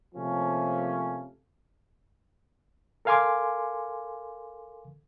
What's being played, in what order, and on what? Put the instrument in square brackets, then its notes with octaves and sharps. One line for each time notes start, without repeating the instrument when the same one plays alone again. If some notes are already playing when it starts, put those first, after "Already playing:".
[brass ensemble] C3 F3 A3 A#3 C#4
[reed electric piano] A4 A#4 F5 G#5 C6 D6